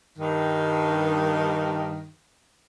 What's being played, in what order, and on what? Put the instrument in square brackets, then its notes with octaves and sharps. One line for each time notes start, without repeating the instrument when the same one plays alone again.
[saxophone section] G2 D#3